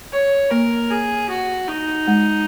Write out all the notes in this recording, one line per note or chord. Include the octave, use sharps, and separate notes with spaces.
C#5
A#3 A#4
G#4
F#4
D#4
G#3